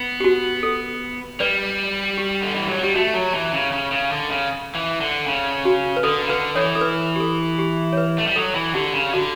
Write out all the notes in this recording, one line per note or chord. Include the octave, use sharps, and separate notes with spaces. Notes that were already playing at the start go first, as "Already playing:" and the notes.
Already playing: B3
G4
F#4
A4
G3 B4 D5
G4
D3
E3
F#3
G3 G4
A3 F#4
F#3
E3
C#3
C#3
C#3
D3
C#3
E3
D3
C#3
F#4
B4
D3 A4
C#3
D3 B4
E3 A4 C#5
A4
B4
G4
A4
G4
C#5
B4
A3
G3
F#3 A4
E3
D3 G4
C#3
D3 F#4